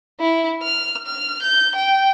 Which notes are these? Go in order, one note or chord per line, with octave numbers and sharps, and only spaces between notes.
E4
F6
F6
G6
G5